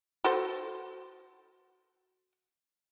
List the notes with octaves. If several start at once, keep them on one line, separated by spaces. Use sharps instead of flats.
F#4 A4 C5